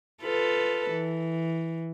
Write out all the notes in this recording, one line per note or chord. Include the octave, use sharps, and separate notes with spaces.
F4 A4 B4
E3